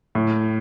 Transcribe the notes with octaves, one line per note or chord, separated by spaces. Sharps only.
A2